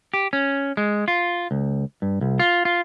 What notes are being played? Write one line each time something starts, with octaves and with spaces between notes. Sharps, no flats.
G4
C#4
G#3
F4
C#2
G2
C2
F4
F4